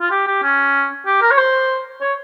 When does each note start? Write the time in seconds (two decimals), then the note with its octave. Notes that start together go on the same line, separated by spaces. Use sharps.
0.01 F4
0.11 G4
0.27 G4
0.43 C#4
1.06 G4
1.22 A#4
1.31 C#5
1.38 C5
2.01 C#5